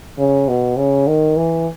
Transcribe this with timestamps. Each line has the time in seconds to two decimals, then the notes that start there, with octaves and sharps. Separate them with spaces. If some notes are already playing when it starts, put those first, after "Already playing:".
0.19 C#3
0.48 B2
0.78 C#3
1.07 D#3
1.37 E3